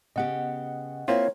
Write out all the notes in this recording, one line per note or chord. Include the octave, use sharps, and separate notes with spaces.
C#3 B3 G4 D#5 F#5
A#3 C4 E4 F4 C#5 E5